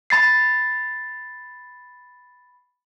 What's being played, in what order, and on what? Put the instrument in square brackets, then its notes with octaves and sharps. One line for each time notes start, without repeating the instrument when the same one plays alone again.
[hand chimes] B5 A6 C7